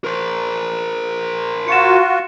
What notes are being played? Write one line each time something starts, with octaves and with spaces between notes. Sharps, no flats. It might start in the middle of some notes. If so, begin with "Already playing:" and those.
A#4 C5
F4 F#4 C#7 E7